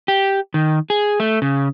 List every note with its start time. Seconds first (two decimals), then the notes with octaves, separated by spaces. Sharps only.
0.08 G4
0.54 D#3
0.90 G#4
1.20 A3
1.42 C#3